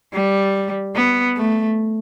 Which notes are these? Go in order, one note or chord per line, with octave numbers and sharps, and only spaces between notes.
G3
B3
A3